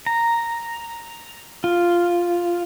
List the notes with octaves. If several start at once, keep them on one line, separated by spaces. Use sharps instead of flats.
A#5
F4